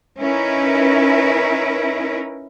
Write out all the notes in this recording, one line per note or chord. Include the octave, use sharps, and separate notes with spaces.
C#4 D#4 E4 A#4 B4